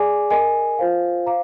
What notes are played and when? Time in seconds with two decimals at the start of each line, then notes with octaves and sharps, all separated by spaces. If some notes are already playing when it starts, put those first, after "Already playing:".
Already playing: G#4 D5 G#5 D6
0.31 A#4 D#5 G#5
0.79 F4 C5 F5
1.26 C5 F5 A#5 D6